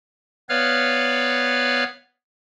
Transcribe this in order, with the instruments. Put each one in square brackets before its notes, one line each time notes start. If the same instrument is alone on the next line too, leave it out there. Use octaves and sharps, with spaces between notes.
[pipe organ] B3 B4 C#5 D5 F5 F6